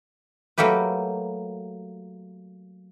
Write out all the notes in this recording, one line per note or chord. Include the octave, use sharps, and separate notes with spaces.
F#3 A3 A#3 G4 B4